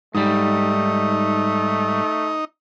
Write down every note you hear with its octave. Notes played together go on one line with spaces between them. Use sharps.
G#2 G3 A3 D#4